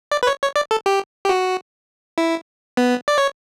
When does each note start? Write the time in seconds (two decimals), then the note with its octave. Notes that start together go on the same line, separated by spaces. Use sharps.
0.12 D5
0.23 B4
0.27 C#5
0.42 C#5
0.56 D5
0.71 A4
0.86 G4
1.25 G4
1.29 F#4
2.18 E4
2.77 B3
3.08 D5
3.18 C#5